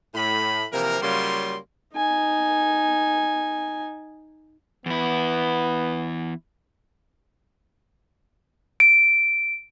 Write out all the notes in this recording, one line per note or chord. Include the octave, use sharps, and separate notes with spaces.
A2 B5
C3 E3 F3 A#3 A#4
C#3 F#3 G3 A#3 F4 C6
D#4 G#5
E2 B3 E4
D7